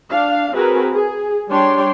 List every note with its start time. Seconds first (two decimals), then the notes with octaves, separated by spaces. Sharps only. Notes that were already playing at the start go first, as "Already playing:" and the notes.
0.11 D4 F5
0.54 C4 F#4 G#4 A#4 B4
0.93 G#4
1.49 G3 D4 C#5 G5 C6